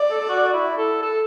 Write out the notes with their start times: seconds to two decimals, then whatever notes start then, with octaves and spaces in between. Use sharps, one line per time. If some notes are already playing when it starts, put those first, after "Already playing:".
Already playing: D5
0.10 A4
0.21 A4
0.29 F#4
0.53 E4
0.77 A4
1.02 A4